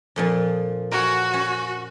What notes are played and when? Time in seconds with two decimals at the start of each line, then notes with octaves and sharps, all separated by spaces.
0.16 F2 A#2 F3
0.91 F#4 A#4 C#5 G#5
1.34 C#4